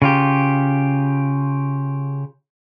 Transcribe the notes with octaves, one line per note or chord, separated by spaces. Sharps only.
C#3 F4 G4